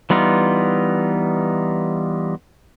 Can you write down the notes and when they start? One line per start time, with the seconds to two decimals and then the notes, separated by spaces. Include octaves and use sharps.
0.10 E3 G3 B3 D#4 F4